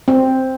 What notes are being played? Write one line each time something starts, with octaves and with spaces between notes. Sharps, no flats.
C4